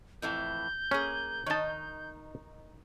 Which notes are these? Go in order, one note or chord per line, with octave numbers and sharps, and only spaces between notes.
F2 A2 E3 G6
A#3 C#4 G#4
D#3 D#4 C#5 A5